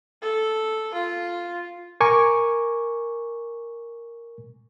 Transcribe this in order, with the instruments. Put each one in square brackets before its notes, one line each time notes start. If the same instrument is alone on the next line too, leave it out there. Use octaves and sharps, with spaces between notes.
[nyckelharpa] A4
F4
[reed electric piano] A#4 G#5 C#6 D6